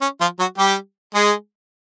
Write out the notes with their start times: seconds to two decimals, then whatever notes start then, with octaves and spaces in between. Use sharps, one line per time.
0.01 C#4
0.21 F3 F4
0.39 F#3 F#4
0.58 G3 G4
1.15 G#3 G#4